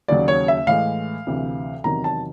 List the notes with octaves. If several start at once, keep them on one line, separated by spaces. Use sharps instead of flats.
D#2 C#3 F#3 D5
C#5
E5
A2 E3 G#3 F5
D2 C3 E3
E2 C3 D#3 F#3 A#5
A5